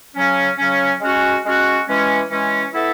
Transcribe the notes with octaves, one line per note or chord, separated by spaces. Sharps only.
C#3 F#3 C#4
C#3 F#3 C#4
G#3 C#4 F#4
G#3 C#4 F#4
E3 G#3 C#4
E3 G#3 C#4
B3 E4 A4 E5